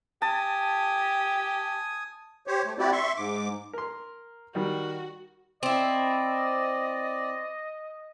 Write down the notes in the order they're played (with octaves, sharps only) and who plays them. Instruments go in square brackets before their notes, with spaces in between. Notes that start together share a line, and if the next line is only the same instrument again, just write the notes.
[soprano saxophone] G4 [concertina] G#5 D#6 [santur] A5
[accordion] G4 C5 C#5
A3
C4 E4 F#4 G4 D5
E5 C6 C#6
G#2 D6
[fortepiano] A#4 C6
[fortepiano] D#3 G3 [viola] F#4
[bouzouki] C4 E4 [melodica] D5 [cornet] D#5